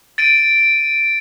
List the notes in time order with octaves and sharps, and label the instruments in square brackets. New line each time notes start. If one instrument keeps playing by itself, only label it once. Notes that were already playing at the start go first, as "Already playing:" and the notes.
[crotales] A6 D7 D#7